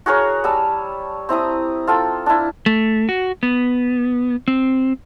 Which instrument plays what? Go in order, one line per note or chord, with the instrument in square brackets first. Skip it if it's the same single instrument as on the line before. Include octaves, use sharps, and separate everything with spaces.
[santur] F#4 G#4 A#4 C#5
G3 A5 E6
C4 E4 A#5 D#6
F4 A4 G5
D4 E4
[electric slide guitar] A3
F#4
B3
C4